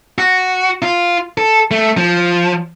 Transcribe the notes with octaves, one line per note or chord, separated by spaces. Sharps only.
F#4
F4
A4
A3
F3